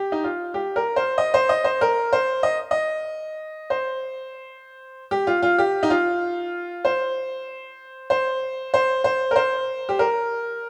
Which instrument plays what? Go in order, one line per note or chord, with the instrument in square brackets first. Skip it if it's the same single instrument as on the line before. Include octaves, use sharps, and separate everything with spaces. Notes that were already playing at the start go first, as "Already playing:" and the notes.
Already playing: [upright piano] G4
D#4
F4
G4
A#4
C5
D#5
C5
D#5
C5
A#4
C5
D#5
D#5
C5
G4
F4
F4
G4
D#4
F4
C5
C5
C5
C5
A#4
C5
G4
A#4